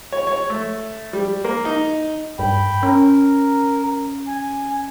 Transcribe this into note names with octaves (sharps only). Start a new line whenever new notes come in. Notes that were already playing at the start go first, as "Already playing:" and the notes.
C#5
C#5
A3
G3
A#3
D#4
G2 G5 B5
C#4 A#4
G#5